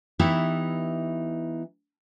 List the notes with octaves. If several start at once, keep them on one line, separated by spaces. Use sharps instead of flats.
E3 B3 D#4 E4 G4 E5